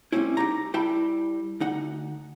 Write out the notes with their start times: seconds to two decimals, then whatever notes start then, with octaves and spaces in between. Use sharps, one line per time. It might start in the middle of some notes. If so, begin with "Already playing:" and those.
0.12 G3 A3 C4 C#4 E4
0.37 D#4 G4 A#5
0.74 G3 E4 G5 A5 B5
1.60 D2 D#4 F#5